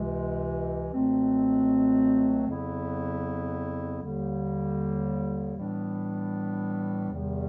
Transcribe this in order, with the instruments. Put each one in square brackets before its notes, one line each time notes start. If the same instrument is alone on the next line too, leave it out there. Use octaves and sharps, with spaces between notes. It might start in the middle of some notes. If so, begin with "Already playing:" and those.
Already playing: [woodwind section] C#2 C3 E3 G#3
C#2 B2 F#3 A3 C4
F2 C#3 F#3 B3 E4
D#2 D3 G3 A#3
A2 E3 G3 B3 D4
E2 C3 D#3 G3